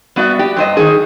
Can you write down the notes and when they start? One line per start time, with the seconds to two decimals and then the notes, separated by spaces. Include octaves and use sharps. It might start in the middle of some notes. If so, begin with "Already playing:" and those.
0.16 G3 B3 F#4 D5 E5
0.39 G4
0.57 G2 C5 D#5
0.77 D#3 F3 D#4 G#4